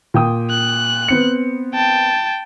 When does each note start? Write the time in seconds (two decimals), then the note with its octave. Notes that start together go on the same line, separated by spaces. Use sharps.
0.14 A#2 G5 D#6
0.51 F#6
1.08 B3 C4 C#7
1.75 G5 A5